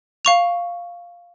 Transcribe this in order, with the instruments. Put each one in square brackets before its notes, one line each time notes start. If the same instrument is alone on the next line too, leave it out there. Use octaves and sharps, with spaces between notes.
[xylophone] F5 C#6 F7